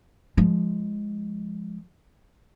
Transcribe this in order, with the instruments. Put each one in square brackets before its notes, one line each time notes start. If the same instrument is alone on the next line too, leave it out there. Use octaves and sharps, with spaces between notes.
[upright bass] F3 G#3